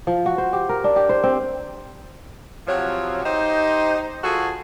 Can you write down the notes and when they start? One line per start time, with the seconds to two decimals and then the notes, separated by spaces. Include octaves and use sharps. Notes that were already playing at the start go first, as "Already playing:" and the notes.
0.07 F3
0.26 F#4
0.38 C5
0.53 G4
0.69 A#4
0.84 D4
0.96 G4
1.09 C5
1.24 C4
2.68 C3 F3 F#3 F#4 C#5
3.24 D#4 G4 C5 D#5
4.24 F3 F#4 G#4 A4